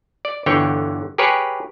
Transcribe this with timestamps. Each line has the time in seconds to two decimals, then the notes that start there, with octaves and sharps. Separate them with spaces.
0.25 D5
0.46 G1 D3 E3 C#5 G5
1.18 G4 G#4 A#4 B4 C#5